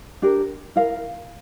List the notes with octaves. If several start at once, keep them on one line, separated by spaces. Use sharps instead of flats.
D4 G4 A#4
E4 A#4 F5